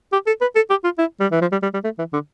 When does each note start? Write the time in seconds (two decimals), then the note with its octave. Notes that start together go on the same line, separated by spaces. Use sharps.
0.13 G4
0.27 A4
0.41 B4
0.55 A4
0.70 G4
0.84 F4
0.98 E4
1.20 G3
1.32 E3
1.41 F3
1.52 G3
1.63 G3
1.74 G3
1.84 A3
1.99 E3
2.13 D3